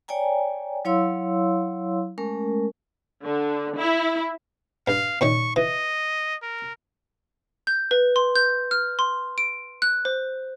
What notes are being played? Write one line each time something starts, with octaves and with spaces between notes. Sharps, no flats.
C#5 D5 G5 G#5 A#5
F#3 E4 C#5 F5 C6 E6
G#3 A3 C#4 A#4
D3
E4
G2 F5
A#2 D#3 C#4 C#6
E3 D#5
A#4
G6
B4
C6
G6
F6
C6
D7
F#6
C5